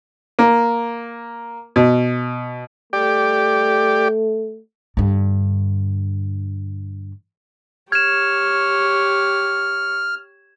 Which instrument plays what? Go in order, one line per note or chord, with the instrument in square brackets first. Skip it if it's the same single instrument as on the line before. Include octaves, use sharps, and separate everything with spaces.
[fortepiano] A#3
B2
[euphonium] A3 [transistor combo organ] G4 D5
[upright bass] G2 D3
[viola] G4 C#5 [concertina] F6 [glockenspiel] G#6 E7